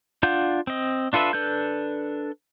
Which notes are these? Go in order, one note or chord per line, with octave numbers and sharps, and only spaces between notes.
D4 F4 F5 F#5 G6
C4 D#5
D4 F4 A4 B4 E5
D4 A4 B4 G6